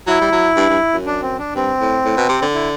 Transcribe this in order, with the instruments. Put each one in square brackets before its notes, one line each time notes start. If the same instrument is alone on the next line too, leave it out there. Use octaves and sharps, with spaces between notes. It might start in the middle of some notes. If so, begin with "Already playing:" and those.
[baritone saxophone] F#3 [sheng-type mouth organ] E4
[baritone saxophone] G3
F#3
G2
G2
F#2
[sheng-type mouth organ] D4
C4
D4
[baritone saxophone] G2 [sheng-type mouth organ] C4
[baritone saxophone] A2
A2
B2
C3
D3
[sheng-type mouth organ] E4